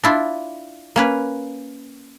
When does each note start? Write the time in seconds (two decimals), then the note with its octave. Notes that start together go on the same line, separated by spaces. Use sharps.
0.04 D4 E4 F4
0.96 A#3 C#4 B4